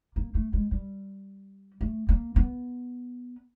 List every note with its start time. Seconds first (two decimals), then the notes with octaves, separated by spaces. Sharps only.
0.16 A#3
0.35 A3
0.53 G#3
0.71 G3
1.81 A3
2.09 A#3
2.36 B3